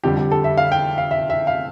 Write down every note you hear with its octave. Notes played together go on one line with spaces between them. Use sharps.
F2 D3 G3 G4
G4
A4
E5
F5
G5
F5
E5
E5
F5